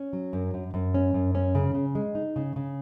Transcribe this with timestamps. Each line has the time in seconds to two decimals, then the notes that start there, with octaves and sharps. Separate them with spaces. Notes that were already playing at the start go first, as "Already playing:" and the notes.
Already playing: C#4
0.13 F#3
0.33 F#2
0.54 F#2
0.74 F#2
0.94 C#4
1.14 F#2
1.35 C#4
1.55 C#3
1.75 C#3
1.95 G#3
2.15 D#4
2.36 C#3
2.56 C#3